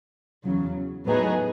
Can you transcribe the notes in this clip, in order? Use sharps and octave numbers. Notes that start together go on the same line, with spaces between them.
E2 C#3 F#3
A2 F#3 B3 D#4 G#4